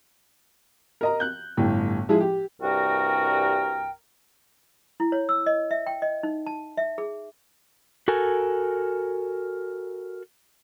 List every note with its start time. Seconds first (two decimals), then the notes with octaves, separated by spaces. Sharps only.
1.01 A#4 D#5 A#5
1.20 F#6 G6
1.57 G1 A2 G5
2.09 F3 G#3 E4 G#4
2.21 G4
2.61 C2 G2 F#4 A#4 G5
5.00 E4
5.12 C#5
5.29 E6
5.46 D#5
5.71 E5
5.86 G5
6.02 D#5
6.23 D#4
6.46 A5
6.77 E5
6.98 G#4
8.08 F#4 A4 A#4 G#5